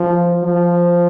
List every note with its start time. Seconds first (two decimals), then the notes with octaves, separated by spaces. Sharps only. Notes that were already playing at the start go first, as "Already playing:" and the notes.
Already playing: F3
0.44 F3